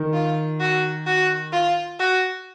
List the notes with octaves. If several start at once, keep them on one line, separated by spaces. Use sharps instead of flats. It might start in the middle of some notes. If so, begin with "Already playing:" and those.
Already playing: D#3
F4
F#4
F#4
F4
F#4